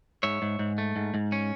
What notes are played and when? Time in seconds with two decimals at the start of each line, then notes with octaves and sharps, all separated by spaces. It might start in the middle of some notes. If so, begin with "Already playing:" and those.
0.23 G#2 C#5 E5
0.42 G#2
0.59 G#2
0.78 A3
0.96 G#2
1.14 G#2
1.32 C#4